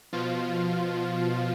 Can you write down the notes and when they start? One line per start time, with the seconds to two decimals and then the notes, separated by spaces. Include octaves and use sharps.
0.13 B2 F3 F4